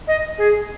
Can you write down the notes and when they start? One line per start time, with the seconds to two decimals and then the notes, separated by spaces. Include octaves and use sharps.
0.07 D#5
0.38 G#4